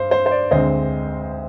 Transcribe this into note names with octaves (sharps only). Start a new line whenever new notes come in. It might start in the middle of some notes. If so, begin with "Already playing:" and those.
Already playing: G2 C5
C5
C5
D5
D2 D3 G#3 C4 C5 D#5